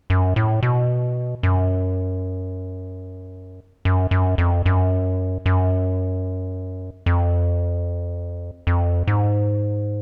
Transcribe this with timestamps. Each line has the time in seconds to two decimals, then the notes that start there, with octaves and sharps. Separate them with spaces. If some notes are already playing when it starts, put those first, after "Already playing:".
0.10 F#2
0.36 A2
0.63 B2
1.43 F#2
3.85 F#2
4.11 F#2
4.38 F2
4.66 F#2
5.46 F#2
7.06 F2
8.67 F2
9.07 G#2